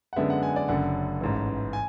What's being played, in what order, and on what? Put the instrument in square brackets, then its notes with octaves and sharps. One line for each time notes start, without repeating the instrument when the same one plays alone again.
[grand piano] F#5
F#2 D3 G#3 B3 E5
F#5
G#5
D5
F#1 F#2 D3 F#5
A1 G#2 E3
G#5